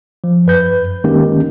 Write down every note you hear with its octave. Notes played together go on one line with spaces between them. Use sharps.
F3
F#2 B4 G6
D#3 G#3 A#3 C#4 G4